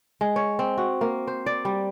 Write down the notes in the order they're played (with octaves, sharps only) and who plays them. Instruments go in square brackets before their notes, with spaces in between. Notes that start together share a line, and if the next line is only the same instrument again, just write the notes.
[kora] G#3
C#5
C4
F#4
A#3
C5
D5
G3